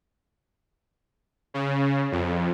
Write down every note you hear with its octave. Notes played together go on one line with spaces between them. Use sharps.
C#3
F2